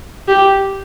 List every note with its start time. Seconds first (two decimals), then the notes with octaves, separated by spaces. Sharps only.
0.28 G4